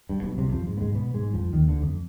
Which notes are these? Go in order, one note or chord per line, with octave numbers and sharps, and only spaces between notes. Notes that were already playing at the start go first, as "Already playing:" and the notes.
G2
B1 B2
C2 C3
F2 F3
G#2 G#3
B3
G#2 G#3
B2 B3
G#2 G#3
F2 F3
D#2 D#3
D2 D3
F2